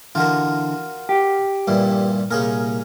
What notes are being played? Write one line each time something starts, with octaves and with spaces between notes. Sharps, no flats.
D3 E3 F4 F#4 A#4
G4
G2 A#2 E3
C2 G2 A#2 C#4 G#4 A#4